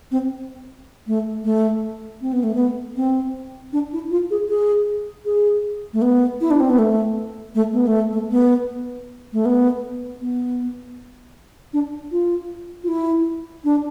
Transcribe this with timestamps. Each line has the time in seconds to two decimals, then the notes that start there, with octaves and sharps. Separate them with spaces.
0.11 C4
1.07 A3
1.44 A3
2.21 C4
2.33 B3
2.43 A3
2.55 B3
2.96 C4
3.73 D4
3.93 E4
4.11 F4
4.31 G#4
4.49 G#4
5.25 G#4
5.93 A3
6.02 B3
6.41 E4
6.51 D4
6.60 C4
6.70 B3
6.79 A3
7.55 A3
7.73 B3
7.87 A3
8.12 A3
8.31 B3
9.33 A3
9.45 B3
10.21 B3
11.73 D4
12.12 F4
12.84 F4
12.88 E4
13.64 D4